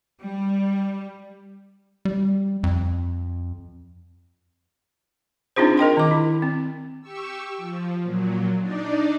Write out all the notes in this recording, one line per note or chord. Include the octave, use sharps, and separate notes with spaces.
G3
G3
F2
C4 D4 D#4 F4 G#4 C5
A#4 D#5 G5 C6
D#3 D6
E4
C4
G4 C#6 E6
F3
A#2 F#3
D4 D#4 D5